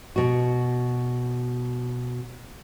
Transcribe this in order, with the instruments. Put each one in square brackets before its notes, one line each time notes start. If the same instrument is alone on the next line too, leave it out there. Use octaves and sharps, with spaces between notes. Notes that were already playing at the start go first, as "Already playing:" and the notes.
[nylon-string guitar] B2 F#4